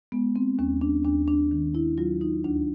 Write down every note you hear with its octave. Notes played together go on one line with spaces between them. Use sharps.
G#3 B3
C4
D#2 C#4
D4
D#2 D4
D4
D#3
E4
F#3 F4
D#4
D2 D4